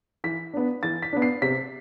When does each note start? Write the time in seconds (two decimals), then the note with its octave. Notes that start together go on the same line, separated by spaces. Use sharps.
0.24 E3 B6
0.54 B3 D4
0.83 E3 A6
1.02 B6
1.13 B3 D4
1.22 C7
1.42 C3 B6